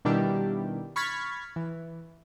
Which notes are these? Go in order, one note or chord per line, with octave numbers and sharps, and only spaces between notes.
B2 D#3 G3 D4 E4 G4
B5 C#6 F6 G#6 A6 B6
E3